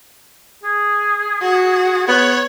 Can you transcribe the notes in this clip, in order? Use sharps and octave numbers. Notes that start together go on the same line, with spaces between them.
G#4
F#4
B3 C#5